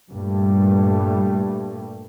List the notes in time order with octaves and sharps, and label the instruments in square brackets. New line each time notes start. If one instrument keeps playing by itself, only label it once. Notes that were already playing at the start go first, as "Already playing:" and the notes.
[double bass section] G2 A#2 G3 A3